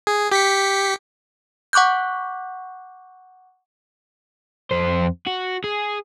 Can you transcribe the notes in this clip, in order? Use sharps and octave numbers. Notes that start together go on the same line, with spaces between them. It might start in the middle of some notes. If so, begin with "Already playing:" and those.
G#4
G4 B6 C#7
F#5 C#6 D6 F#6 G6
F2 C5
F#4
G#4